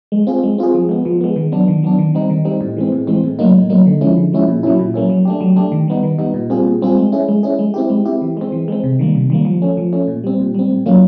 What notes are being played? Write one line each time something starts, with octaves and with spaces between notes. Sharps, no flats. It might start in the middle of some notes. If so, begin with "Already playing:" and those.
G#3
C4 F4 G#4
G#3
C4 F4 G#4
F3
G#3 B3
F3
G#3 B3
D#3
F#3 B3 D4
D#3
F#3 B3 D4
D#3
G3 C4 D#4
D#3
G3 C4 D#4
A2
E3 G#3 C4
A2
E3 G#3 C4
A2
F#3 A#3 D#4
A2
F#3 A#3 D#4
D3
F3 G#3 C#4 E4
D3
F3 G#3 C#4 E4
A#2
F#3 A#3 C#4 E4
A#2
F#3 A#3 C#4 E4
F#3
A3 D4 G4
F#3
A3 D4 G4
D#3
G3 B3 D#4
D#3
G3 B3 D#4
A#2
G3 C4 F4 G#4
A#2
G3 C4 F4 G#4
G#3
C#4 E4 G#4
G#3
C#4 E4 G#4
G#3
C4 E4 G4
G#3
C4 E4 G4
E3
G#3 C4
E3
G#3 C4
C3
D#3 G3 A#3
C3
D#3 G3 A#3
F3
A3 C#4
F3
A3 C#4
A#2
G3 C4
A#2
G3 C4
A2
F#3 A#3 C#4 F4